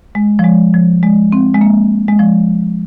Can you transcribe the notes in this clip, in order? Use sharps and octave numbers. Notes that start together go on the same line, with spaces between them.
G#3
F3
G#3
F3
G#3
C4
G#3
A#3
G#3
F3